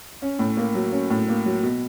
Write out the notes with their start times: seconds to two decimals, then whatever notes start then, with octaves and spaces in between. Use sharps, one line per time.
0.22 C#4
0.39 A2
0.57 A#3
0.75 F#3
0.92 C#4
1.10 A2
1.28 A#3
1.46 F#3
1.63 B2